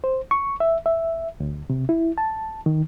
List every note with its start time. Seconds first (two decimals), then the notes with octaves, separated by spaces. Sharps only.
0.04 C5
0.31 C#6
0.60 E5
0.86 E5
1.40 D2
1.70 C3
1.89 E4
2.18 A5
2.66 D#3